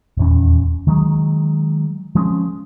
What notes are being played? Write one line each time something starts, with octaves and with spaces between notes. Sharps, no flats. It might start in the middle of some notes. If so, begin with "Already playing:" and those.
D#1 E2 C#4
D#3 F#3 G#3
F3 G#3 C4 C#4